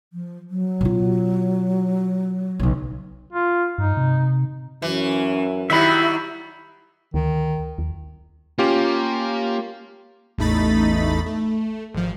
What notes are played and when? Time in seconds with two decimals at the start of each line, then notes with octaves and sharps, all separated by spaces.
0.13 F3
0.50 F#3
0.81 B2 F4
2.59 B1 C#3
3.32 F4
3.78 G2 D#4
3.97 C3
4.82 F#2 E3 C#4
5.70 D#3 F#3 G3 E4 E5 B5
7.14 D2 D#3
7.78 D#2
8.59 A#3 C#4 F4 G4
10.38 A1 E2 A3 D#4 B5 A6
11.26 A3
11.94 G#1 F3